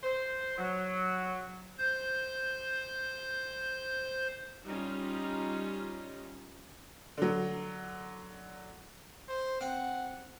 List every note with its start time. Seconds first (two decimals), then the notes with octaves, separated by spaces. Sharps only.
0.03 C5
0.58 F#3
1.78 C5 G6
4.68 G3 C#4 D#4 F4
7.18 D3 F#3
9.29 C5
9.61 C4 F#5